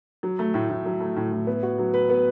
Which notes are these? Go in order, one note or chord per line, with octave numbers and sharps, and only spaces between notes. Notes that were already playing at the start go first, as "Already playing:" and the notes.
F#3
A3
A2
A2
F#3
A3
A2
A2
B3
F#4
F#3
B4
B3